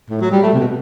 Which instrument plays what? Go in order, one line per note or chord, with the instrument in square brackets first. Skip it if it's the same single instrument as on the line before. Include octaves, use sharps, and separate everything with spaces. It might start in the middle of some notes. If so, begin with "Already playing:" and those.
[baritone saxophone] A2
F#3
G3
A3
C3
B2